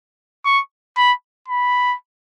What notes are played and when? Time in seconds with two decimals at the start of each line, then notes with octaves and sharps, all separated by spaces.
0.45 C#6
0.97 B5
1.48 B5